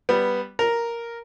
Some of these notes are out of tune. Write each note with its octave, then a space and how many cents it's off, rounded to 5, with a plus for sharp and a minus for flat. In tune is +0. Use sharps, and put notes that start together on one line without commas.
G3 +0 B3 +0
A#4 +0 A#5 +0